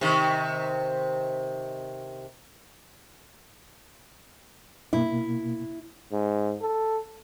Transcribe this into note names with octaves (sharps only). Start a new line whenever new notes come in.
C3 D#3
B2 A#3 E4
G#2
A4